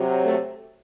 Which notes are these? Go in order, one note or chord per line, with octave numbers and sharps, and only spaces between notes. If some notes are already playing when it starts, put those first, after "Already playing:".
Already playing: C3 F#3
A3